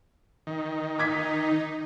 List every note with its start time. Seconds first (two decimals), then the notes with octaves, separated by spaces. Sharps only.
0.47 D#3
0.99 D#4 D6 G#6 B6